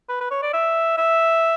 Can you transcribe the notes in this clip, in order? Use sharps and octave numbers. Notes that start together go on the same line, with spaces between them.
B4
B4
C#5
D5
E5
E5